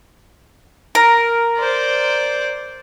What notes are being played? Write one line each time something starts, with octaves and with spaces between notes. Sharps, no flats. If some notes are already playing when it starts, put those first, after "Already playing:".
A#4
C5 D5